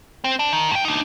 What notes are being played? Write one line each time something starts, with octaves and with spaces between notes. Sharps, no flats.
C4
D4
D#3
G2 G5
D4 D#4